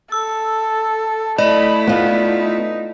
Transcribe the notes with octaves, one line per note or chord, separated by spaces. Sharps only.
A4 E6
A3 E4 D5 D#5 B5
B3 D#4 F4